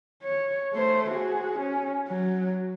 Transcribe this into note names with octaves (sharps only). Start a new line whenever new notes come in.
C#5
A3 C5
F#4 G#4
C#4
F#3